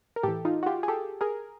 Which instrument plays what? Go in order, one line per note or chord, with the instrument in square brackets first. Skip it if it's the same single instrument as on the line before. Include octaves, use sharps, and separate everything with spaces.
[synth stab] A#4
A2 E3 G4 A4
D#4 F4
F#4
F4 G4
G#4
G4 A4
G#4 A#4